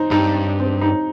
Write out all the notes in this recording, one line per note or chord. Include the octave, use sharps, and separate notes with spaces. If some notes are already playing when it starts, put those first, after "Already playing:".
Already playing: C4 D#4
G2 D#4
C4
D#4